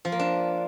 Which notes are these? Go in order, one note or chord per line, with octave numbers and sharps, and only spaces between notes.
F3
A#3
D4